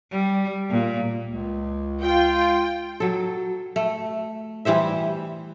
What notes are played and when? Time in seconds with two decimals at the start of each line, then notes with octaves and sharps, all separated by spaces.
0.11 G3
0.70 A#2
1.28 C#2
2.02 F4 G5
3.00 F#3 A4
3.76 A3
4.65 E3 G3 C5 E5